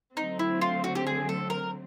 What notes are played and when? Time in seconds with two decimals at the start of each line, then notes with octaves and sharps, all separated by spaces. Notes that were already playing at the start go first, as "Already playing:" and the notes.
0.17 D3 F#3 A3 C4 D#4
0.39 E4
0.61 F4
0.84 F#4
0.95 G4
1.07 G#4
1.29 A4
1.50 A#4